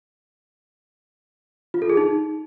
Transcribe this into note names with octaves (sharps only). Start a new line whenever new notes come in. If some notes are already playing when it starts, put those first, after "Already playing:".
F4
A4
G#4
D#4